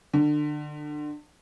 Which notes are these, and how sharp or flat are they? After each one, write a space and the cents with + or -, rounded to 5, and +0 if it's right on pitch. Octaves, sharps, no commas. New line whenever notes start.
D3 +25